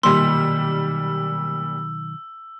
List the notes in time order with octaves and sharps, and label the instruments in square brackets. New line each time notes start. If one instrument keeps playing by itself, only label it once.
[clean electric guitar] B1 D#3 [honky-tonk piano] A#2 G3 [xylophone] C6 [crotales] E6